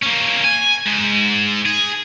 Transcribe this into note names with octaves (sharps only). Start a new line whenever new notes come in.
A#3 C#4
G#5
G#2
G#4